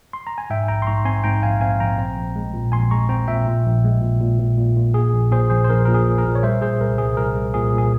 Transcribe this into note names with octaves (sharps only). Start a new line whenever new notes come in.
C6
A#5
G#5
G#2 E5 G5
A#1 G5 A#5
C6
G#2 A#5 C#6
C4 G#5 C6
G#2 G5 A#5
A#1 F5 G#5
C4 F5 G#5
A#1 G5 A#5
C4
A#1
G#3
A#2
A#1 G#5 C6
G#3 A#5 C#6
C4 G5 A#5
A#2 E5 G5
A#2
A#1
G#3
A#2
A#2
A#2
A#2
A#2
A#3 G#4
A#1
A#2 G#4 C5
A#1 G#4 C5
C5
A#1 A#4
A#2 A#4
G#4
A#2
A#4
A#2
C#5
G3 C5 E5
A#2 G#4 C5
C2 A#4
C2 G#4
C2 A#4
G3
A#2 G#4
A#2
G#4